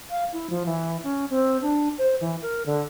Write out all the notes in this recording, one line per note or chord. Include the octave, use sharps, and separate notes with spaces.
F5
E4
F3
E3
C#4
C4
D4
C5
E3
A#4
D3